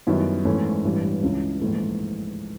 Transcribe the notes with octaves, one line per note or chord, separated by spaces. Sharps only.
F#2 D#3 G3 B3 E4
G#1 G#2 E3 A3 C#4
A1 G2 E3
C#2 C#3 E3
A#1 G#2 E3 A3